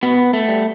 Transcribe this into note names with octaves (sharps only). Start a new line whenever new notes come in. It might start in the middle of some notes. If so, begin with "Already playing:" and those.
B2 B3
A3
G3